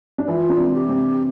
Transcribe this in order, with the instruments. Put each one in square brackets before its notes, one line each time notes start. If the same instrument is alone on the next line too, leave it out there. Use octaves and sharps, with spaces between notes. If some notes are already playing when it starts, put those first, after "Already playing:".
[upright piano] D4
[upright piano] E3 E4 [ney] F4
[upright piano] D4
C3 C4
[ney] G4
[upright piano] C3 C4